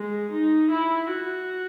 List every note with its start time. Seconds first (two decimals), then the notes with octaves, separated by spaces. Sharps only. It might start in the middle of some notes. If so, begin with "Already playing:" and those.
Already playing: G#3
0.31 D#4
0.71 E4
1.10 F#4